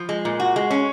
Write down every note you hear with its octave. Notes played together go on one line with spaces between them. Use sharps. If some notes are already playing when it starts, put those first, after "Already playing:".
Already playing: F3
G#3
A#2
F#4
G#3
C#4